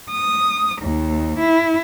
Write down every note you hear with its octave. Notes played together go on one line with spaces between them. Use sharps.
D#6
D#2
E4